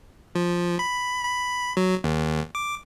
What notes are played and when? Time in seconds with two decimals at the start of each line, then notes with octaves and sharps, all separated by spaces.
0.35 F3
0.79 B5
1.25 B5
1.77 F#3
2.04 D#2
2.55 D6